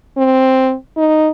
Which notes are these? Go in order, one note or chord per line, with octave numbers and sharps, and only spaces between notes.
C4
D#4